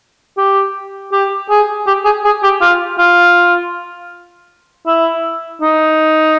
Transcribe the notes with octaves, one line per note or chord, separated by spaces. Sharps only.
G4
G4
G#4
G4
G#4
G#4
G4
F4
F4
E4
D#4